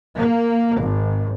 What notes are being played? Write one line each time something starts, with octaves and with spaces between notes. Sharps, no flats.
A#3
G#1